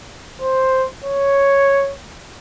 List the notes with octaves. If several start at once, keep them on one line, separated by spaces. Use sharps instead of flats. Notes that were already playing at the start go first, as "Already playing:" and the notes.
C5
C#5